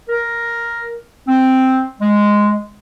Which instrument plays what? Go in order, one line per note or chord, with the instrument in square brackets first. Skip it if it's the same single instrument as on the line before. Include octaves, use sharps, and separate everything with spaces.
[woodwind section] A#4
C4
G#3